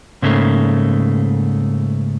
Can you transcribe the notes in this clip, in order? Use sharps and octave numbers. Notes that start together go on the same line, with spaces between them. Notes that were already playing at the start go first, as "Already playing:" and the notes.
G#2 C#3 A3 A#3